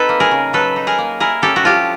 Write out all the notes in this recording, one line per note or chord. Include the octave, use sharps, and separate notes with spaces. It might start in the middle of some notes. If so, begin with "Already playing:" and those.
Already playing: C4 D#4 A4 B4
A#3
G#4 A#4
C#3
F#3 A4 B4
D#4
G#4 A#4
A#3
E4 G#4 A#4
C#4 G4 A4
F#4
F3 F4 G4